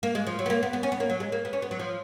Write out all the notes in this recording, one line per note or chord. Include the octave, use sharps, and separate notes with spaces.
A#3
G#3
F3
F#3
B3
A#3
B3
B3
C#4
B3
A#3
F#3
G#3
A#3
B3
C#4
B3
F#3
F3